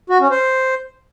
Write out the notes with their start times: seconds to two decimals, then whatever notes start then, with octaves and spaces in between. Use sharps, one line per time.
0.10 F#4
0.20 C#4
0.31 C5